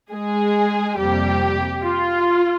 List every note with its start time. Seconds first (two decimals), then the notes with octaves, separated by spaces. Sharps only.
0.11 G#3 G#4
0.98 F2 C3 G3 A#3 G4
1.84 F4